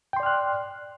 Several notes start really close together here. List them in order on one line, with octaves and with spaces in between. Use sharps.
G5 C6 D5 F6 F#6